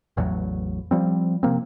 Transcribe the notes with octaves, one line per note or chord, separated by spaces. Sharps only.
A1 E2 A2 F#3
F3 G3 C4
C3 F3 A#3 C4